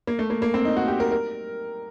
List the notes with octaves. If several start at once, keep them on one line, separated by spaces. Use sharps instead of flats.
A#3
A3
A#3
A#3
C4
D#4
F#4
G4
A#4
A#4